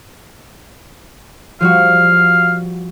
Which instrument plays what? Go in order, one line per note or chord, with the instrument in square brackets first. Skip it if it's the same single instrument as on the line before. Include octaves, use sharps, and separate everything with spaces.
[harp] F3 G3 F#4 [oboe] F5